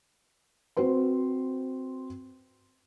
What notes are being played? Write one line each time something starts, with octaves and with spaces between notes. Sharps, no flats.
C4 F#4 B4 C5 C6